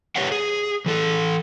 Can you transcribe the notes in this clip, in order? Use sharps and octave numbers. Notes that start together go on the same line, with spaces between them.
G4 B4 C#5 E5 F#5
G#4
E3 A4